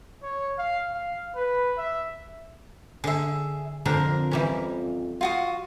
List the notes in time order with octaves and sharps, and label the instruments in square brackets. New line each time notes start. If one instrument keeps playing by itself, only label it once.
[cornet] C#5
F5
F5
B4
E5
[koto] D3 [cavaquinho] G#4 E5
[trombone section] F2 [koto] D3 C4 D4 [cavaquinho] A#4
[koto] E3 G3 C#4
[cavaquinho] F4 F#4 D#6